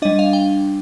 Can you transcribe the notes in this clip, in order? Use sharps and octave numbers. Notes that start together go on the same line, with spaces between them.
G3 D4 D#5
F5
G5